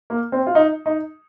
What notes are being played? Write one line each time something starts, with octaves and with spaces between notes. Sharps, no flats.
A#3
C4
F4
D#4
D#4